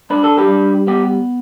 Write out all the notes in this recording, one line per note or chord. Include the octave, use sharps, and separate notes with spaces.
D4 B4
A4
G4 B4
G3
B3 G4